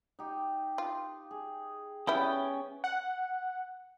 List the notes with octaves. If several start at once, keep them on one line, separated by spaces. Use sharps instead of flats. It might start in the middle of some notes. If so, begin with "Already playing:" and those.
D#4 G4
F4
G#4
G3 B3 C#4 E4 G5
F#5